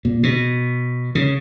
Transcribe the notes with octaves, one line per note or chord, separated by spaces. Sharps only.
A#2
B2
C#3